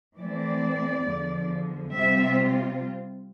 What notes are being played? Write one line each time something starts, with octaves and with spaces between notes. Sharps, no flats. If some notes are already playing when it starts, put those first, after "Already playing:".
E3 A3 C4 D5
E2 D3 F3
C3 G3 C4 F4 E5